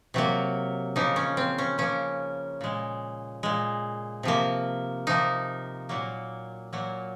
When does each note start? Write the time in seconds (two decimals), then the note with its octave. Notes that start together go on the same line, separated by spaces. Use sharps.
0.14 C3 F#3 A#3
0.96 C#3 F3 A#3 D#4
1.16 C#4
1.37 C4
1.58 C#4
1.78 C#3 F3 A#3 C#4
2.61 A#2 G#3
3.43 A#2 G#3
4.23 C3 F3 A#3
5.07 C3 F3 A#3 D#4
5.89 A#2 F#3 A#3
6.73 A#2 F#3 A#3